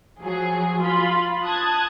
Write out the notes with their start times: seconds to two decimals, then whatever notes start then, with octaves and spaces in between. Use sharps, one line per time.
0.21 F3 F#3 G#4
0.81 F4 B5
1.45 A5 D#6 F#6 G#6